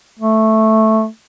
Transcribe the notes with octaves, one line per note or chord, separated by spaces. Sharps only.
A3